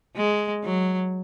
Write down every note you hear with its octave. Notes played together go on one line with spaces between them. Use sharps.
G#3
F#3